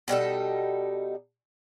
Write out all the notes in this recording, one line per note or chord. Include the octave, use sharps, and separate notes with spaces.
B2 G3 D#4 A4